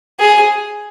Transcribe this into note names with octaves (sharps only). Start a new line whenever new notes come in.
G#4